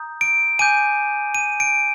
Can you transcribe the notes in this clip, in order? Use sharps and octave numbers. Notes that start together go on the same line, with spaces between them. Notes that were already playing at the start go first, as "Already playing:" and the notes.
Already playing: A#5 D#6 G6
D7
G#5 D6 G6 D#7
D#7
D7